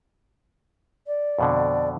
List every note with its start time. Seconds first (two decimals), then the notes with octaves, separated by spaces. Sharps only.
1.07 D5
1.39 F2 B2 D3